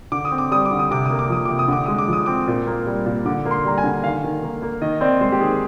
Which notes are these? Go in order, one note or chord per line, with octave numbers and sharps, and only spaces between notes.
D3 D6
D#6
C4
D6
G3 D#6
D6
D3
D#6
C3 D6
A#3 D#6
D6
F3 D#6
C3 D6
D#6
D3 D6
G#3 D#6
D6
F3
D#6
C4 D6
A#2
A#3
G3
A#2
D3 D6
A#3
C6
G3 A#5
G#5
D3
D#3 F5
D#3
A#3
A#3
D#3 D#5
C4 D5
G#3 C5
G4
D#3 G#4